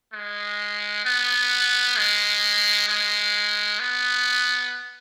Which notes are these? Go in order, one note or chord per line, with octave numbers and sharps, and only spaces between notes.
G#3
B3
G#3
G#3
B3